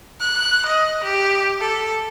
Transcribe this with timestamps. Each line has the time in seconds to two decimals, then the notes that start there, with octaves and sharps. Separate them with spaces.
0.20 F#6
0.66 D#5
1.04 G4
1.60 A4